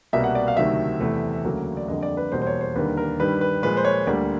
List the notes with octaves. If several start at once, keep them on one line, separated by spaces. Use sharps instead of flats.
C2 B2 G3 A#3 E5
F#5
D5
F5
D2 C3 D#3 F#3 A3 E5
E2 C3 E3 A3
D2 C#3 F#3 A#3
D5
F2 D3 G3 A#3 D#5
D5
B4
E2 B2 G3 A#3 C5
C5
C#5
C5
D#2 D3 G3 A#3 B4
A#4
G2 D#3 G3 B4
B4
A#2 F3 G#3 B4
C5
C#5
D2 D3 G3 A#3 D5